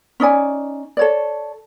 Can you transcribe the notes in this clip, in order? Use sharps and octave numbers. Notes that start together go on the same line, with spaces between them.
C#4 D#4 D5 G#5
A4 C#5 D5